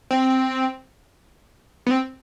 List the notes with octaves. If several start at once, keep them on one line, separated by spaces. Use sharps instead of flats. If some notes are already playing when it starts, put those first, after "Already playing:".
C4
B3
C4